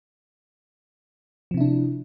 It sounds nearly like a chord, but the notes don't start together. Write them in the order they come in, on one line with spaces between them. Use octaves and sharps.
F3 C3 E4 D4